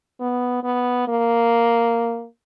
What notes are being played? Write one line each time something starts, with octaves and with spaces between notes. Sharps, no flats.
B3
B3
A#3